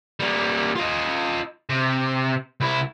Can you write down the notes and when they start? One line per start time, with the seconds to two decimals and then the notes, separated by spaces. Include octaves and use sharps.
0.20 G3 A#3
0.76 F4 D#5
1.70 C3
2.61 C2 E4